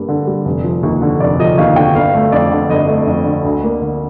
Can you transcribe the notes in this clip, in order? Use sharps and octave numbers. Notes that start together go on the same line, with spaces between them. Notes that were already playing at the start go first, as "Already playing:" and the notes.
Already playing: G2 G3 A#3
D3
G3
F1
F3
D#2
D3
F1 D5
F3 D#5
D#2 F5
D3 G5
G1 F5
A3
F2 D5
D3
G1 D#5
A3
F2
D3
D2
A#3
D3